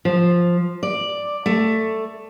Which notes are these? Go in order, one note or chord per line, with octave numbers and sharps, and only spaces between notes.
F3
D5
A3